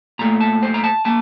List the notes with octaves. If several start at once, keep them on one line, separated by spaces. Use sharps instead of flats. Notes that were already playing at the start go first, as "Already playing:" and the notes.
A#2 A3 A#5
A5
C5
A#5
A5
A#3 A5